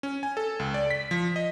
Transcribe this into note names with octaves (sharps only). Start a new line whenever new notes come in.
C#4
G#5
A4
C#2
D5
B6
F3
D#5